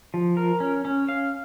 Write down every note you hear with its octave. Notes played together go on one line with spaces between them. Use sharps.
F3
A#4
C#4
C#4
F5